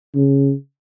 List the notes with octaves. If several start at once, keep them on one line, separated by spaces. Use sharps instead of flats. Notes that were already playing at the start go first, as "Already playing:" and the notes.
C#3